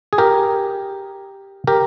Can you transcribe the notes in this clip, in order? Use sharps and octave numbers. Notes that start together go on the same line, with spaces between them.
G#4
G4 A#4
G4 A#4